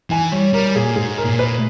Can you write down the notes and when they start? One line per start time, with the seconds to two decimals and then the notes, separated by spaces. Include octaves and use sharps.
0.10 E3 G#5
0.32 G3 C#5
0.53 G3 A#4
0.75 A#2 G#4
0.96 G#2 G#4
1.18 A#4
1.25 A#2
1.39 B4